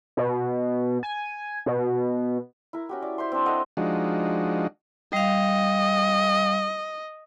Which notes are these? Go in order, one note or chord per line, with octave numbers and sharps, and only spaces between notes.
B2
G#5
B2
E4 A#4
C#4 F#4 G4
D5
C5 E5 C6
C4 D4
A4 D#5 F#5
F3 G#3 D4 D#4 F#4
G3 D#5 F5